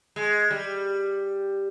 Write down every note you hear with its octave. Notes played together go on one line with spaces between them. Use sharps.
G#3
G3